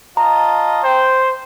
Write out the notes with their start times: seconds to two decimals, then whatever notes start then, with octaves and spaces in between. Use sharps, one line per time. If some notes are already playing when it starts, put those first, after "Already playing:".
0.17 F4 D#5 A5 A#5
0.84 C5 G5